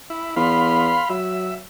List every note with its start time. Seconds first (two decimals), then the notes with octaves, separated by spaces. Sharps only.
0.10 E4
0.36 E2 F5 B5 C6
1.10 F#3 E5